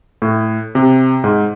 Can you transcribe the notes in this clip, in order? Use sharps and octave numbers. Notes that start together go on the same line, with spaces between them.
A2
C3
G#2